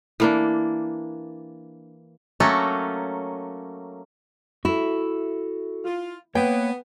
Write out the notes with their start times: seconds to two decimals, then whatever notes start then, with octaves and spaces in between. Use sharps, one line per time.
0.20 E3 A#3 D4
2.40 F#3 A3 A#3 C#4
4.65 E4 F#4 A4
5.85 F4
6.35 A#3 B3 B4 C#5 G5